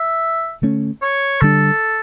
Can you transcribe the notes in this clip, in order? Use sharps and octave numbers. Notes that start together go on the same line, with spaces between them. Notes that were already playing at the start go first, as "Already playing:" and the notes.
Already playing: E5
D3 A3 C#4
C#5
D3 G3 D4 A4